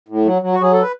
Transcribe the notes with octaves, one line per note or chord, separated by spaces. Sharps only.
A2
F#3
F#3
F#4
F#3 G#4
A4
B4